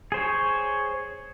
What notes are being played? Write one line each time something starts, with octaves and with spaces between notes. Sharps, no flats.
G#4 C5 C#5